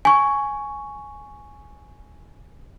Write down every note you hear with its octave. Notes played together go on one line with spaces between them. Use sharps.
G#5 C#6